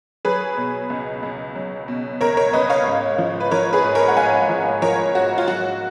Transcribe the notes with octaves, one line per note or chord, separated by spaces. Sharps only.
F#3 G#4 B4
B2
C#2
C#2
F#3
B2
C#2 A#4 C#5
A#4 C#5
C#2 B4 D#5
C#5 F5
G#2
F3
B4
F3 A#4 C#5
G#4 B4
G#2
A#4 C#5
F#5
G#2 F5 G#5
F3
F3 A#4 C#5
G#2 F#4
F4
F#3 F#4